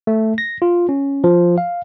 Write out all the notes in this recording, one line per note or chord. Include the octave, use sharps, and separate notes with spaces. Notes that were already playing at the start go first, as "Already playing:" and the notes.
A3
A#6
F4
C#4
F3
F5